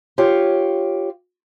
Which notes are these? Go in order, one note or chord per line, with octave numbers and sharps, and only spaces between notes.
F4 G4 C#5